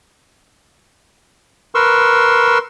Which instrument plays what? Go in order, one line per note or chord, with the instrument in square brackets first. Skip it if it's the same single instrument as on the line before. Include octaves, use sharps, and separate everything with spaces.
[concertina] A#4 B4 C6 C#6 E6